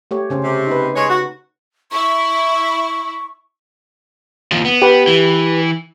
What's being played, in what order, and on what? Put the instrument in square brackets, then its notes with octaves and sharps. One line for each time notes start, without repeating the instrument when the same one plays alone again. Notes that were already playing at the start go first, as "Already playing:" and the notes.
[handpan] A3 G4 C#5
C#3 C#4 C5
[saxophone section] C3
[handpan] D#4 B4
[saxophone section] G#3 C#5
F#4
[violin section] E4 [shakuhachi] C#6
[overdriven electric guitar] D#2 F3
B3
[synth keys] G4 B4
[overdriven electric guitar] E3